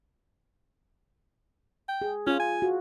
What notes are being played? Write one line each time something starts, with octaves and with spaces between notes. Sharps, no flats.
G5
G#4
C#4 F4
G#5
F#4